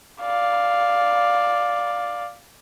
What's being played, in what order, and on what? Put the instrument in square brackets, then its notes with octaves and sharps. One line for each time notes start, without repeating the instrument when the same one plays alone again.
[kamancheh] D5 F5